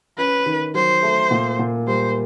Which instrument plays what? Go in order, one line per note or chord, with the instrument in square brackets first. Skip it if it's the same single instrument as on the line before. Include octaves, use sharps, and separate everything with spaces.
[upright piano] C#4 [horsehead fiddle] B4
[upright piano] D#3
[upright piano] F#3 [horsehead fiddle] C5
[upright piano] A3
A#2
A#2
[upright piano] G3 [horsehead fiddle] C5